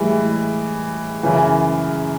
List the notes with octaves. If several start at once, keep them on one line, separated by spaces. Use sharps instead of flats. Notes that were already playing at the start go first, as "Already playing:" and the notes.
Already playing: A2 E3 G3 G#3
F#2 C#3 E3